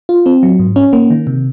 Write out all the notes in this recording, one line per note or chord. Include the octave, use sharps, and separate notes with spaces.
F4
C4
F#3
G#2
C#4
A#3
D#3
C3